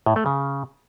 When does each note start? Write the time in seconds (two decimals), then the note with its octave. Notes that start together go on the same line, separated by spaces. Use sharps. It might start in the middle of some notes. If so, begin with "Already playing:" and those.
0.06 A2
0.16 A3
0.26 C#3